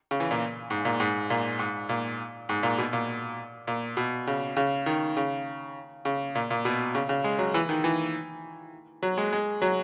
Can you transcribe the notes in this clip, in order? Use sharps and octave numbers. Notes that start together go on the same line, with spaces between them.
C#3
E3
A#2
G#2
A#2
G#2
A#2
G#2
A#2
G#2
A#2
B2
A#2
A#2
B2
C#3
C#3
D#3
C#3
C#3
A#2
A#2
B2
C#3
C#3
G#3
F#3
E3
D#3
E3
F#3
G#3
G#3
F#3